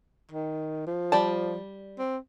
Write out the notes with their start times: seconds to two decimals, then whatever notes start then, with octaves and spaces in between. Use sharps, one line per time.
0.31 D#3
0.87 F3
1.12 G3 D5 A5
1.99 C4